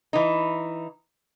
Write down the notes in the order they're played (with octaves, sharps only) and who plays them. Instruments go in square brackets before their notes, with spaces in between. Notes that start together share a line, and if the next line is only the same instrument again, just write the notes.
[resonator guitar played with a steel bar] E3 D#4